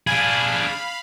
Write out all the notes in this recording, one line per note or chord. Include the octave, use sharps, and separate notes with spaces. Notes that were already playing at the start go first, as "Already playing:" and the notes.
D4 G#4 F5 B5